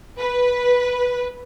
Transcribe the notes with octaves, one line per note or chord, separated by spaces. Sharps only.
B4